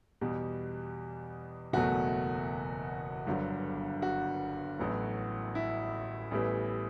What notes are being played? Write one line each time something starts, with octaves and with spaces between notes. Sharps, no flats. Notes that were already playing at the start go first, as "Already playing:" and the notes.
E2 B2 G3
F#1 E2 B2 F#3 A3 F#4
G1 G2 D3 F#3
F#4
A1 A2 F#3 B3
E4
A1 A2 E3 G3 B3